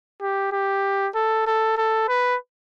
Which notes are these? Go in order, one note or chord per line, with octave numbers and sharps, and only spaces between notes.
G4
G4
A4
A4
A4
B4